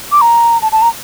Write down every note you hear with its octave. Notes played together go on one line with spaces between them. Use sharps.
D6
A#5
A5
A5
A#5